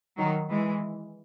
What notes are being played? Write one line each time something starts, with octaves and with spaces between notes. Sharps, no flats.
D#3 F#3
E3 G#3